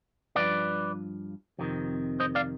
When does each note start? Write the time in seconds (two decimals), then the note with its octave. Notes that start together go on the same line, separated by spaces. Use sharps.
0.36 G2 F3 B4 D5
1.59 F2 C3 D#3
2.20 C5 D#5
2.35 D5 F5